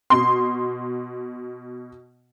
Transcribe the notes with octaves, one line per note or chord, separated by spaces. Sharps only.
B2 C6